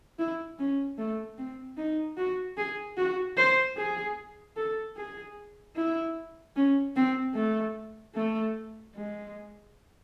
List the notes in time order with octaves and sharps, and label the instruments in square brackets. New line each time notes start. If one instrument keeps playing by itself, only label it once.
[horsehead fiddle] E4
C#4
A3
C4
D#4
F#4
G#4
F#4
C5
G#4
A4
G#4
E4
C#4
C4
A3
A3
G#3